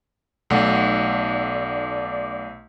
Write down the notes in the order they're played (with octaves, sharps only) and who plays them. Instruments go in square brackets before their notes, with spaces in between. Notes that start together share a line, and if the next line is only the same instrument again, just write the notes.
[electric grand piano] B1 A3 F#5 [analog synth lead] D5